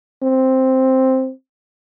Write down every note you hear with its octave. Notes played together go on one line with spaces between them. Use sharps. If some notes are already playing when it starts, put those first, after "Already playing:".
C4